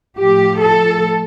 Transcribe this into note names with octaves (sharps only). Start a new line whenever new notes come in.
A2 F3 G4
A4